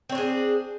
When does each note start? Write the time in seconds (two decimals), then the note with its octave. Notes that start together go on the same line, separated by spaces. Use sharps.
0.09 C4
0.12 C#5
0.15 D4
0.18 G#4